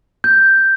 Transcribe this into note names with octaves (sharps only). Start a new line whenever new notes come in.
G6